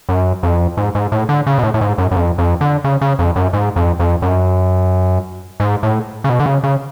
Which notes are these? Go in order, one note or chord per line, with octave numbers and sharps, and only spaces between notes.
F#2
F2
G#2
G#2
A2
D3
C#3
B2
A2
A2
G#2
F#2
F#2
F2
F2
D3
C#3
C#3
F2
F#2
G#2
F2
F2
F#2
G#2
A2
C#3
B2
D3
C#3
C#3